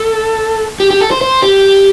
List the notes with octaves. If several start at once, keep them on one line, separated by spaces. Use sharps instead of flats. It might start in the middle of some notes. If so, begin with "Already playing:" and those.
Already playing: A4
G4
G4
A4
C5
C5
G4